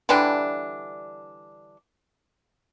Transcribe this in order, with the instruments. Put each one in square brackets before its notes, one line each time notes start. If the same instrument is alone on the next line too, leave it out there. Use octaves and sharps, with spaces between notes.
[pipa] D3 E3 G3 D4